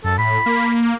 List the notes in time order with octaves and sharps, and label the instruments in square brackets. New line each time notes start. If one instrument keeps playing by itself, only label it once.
[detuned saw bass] F#2 [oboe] A4
[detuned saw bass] A2 [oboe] B5
[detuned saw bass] A#3